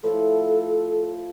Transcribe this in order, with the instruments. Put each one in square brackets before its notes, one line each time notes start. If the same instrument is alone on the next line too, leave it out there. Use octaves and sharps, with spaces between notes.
[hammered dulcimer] A2 F3 B4 [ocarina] A4